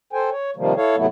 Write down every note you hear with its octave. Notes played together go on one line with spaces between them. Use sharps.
A4 C5 G5 G#5
C#5
C3 D#3 F3 G3 A#3
E4 A4 C#5 F5
G#2 C3 F#3 A3 B3 E4